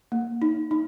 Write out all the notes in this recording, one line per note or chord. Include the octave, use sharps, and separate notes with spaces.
A#3
D#4
D#4